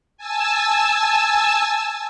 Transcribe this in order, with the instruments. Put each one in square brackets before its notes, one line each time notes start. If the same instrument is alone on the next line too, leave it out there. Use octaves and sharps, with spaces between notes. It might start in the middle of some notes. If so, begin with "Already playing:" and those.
[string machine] G#5 A5 E6